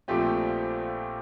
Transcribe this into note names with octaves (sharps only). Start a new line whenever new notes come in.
A#1 A#2 F3 A3 C4 G4